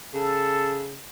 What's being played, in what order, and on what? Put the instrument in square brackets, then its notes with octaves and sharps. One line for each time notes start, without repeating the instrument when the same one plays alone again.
[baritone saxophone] C#3 [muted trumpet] A4